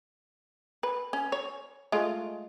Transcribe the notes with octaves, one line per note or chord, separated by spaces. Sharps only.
B4
C#4
C#5
G#3 A3 F4